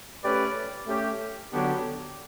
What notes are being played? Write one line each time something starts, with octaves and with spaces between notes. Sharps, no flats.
A3 C#4 G4 B4 D5
A3 C#4 G4
D3 F#3 B3 D4 G4